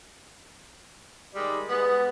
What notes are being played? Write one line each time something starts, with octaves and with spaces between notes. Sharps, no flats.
D#3 G3 G#3
G#3 B3